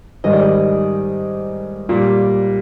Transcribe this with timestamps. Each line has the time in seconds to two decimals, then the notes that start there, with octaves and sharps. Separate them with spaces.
0.24 G#2 D#3 G3 D#5
0.33 D5
0.43 D#5
1.89 A#2 G3